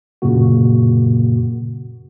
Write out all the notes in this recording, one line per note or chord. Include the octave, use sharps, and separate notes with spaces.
F#2 A#2 C#3 A#3 F#4